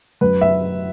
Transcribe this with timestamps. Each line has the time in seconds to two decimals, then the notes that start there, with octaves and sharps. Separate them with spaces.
0.21 F#2 B4
0.41 E5